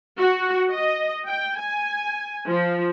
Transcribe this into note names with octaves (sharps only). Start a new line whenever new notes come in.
F#4
D#5
G5
G#5
F3